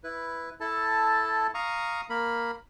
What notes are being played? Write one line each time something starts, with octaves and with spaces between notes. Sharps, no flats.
E4 B4
E4 A4 A5
F5 A#5 C#6 D#6
A#3 A#4 B5